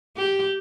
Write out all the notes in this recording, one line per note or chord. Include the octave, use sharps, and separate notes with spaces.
G4